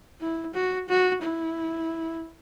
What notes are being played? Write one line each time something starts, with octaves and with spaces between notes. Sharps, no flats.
E4
F#4
F#4
E4